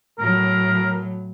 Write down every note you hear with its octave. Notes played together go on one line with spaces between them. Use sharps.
A2 F#3 A#4